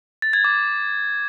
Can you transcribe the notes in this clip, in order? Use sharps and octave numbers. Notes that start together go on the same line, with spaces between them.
A6
G#6
D6